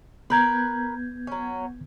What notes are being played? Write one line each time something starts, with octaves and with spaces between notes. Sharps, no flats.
B3 A#4 B4 G6 G#6
F#3 C#4